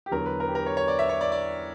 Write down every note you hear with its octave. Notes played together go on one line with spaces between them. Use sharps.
G4
E2 D3 F#3 A#4
B4
A#4
G4
A#4
C#5
C#5
D5
E5
C#5
D5
D5